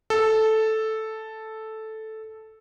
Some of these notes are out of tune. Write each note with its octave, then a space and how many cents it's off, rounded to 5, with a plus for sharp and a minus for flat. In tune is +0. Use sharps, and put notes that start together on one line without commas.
A4 -5